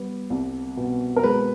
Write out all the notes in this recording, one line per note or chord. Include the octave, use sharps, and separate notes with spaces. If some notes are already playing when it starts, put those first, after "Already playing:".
Already playing: G3 B3
C2
B2
A#4
G#3 B4